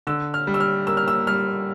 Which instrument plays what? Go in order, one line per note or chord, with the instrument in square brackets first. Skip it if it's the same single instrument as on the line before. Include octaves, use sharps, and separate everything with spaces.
[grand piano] D3 [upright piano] E6
[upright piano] F6
[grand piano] G3
[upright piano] E6
F6
[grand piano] A#3 [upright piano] E6
[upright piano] F6
E6
[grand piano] G3 [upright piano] F6